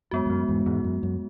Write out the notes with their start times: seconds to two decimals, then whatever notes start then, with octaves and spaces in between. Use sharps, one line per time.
0.11 F#2 G#3 B3 F#4
0.26 E2
0.30 F#2
0.48 E2 G#2
0.66 E2 G#2
0.84 F#2
1.03 F#2